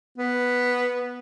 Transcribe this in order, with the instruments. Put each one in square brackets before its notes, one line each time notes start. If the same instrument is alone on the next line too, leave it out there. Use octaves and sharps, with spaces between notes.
[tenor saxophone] B3